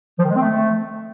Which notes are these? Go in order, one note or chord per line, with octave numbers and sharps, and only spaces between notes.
F3
D#3
G#3
C4
A3